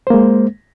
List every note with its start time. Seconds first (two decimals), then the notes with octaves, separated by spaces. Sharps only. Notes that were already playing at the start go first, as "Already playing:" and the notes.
0.07 C5
0.10 A#3
0.14 G#3